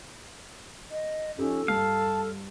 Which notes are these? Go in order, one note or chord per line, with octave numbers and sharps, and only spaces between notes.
D#5
F3 C#4 D#4 G4 A4
G2 F5 A5